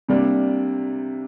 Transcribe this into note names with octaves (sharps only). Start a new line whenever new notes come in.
C3 G3 A#3 D4